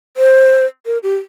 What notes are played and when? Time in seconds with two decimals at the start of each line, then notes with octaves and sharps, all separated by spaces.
0.17 C5
0.86 A#4
1.03 G4